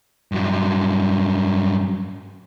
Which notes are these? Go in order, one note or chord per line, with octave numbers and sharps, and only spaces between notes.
G2 F#3